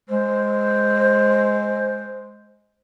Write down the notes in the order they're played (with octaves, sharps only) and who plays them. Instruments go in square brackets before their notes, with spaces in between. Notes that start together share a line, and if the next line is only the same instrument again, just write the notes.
[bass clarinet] G#3 [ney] C5